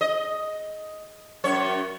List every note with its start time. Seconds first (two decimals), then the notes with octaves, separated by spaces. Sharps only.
0.01 D#5
1.44 F#2 C#5